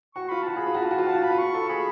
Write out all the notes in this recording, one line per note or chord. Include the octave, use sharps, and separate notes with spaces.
F#4 C#6
F4 B5
F#4 A5
G#4 B5
F4
F#4
A5
F4
F#4
F4
F#4 A5
F4
F#4 B5
F4
C#6
A4
G#4 B5